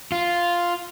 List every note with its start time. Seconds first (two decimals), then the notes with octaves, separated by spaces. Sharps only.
0.12 F4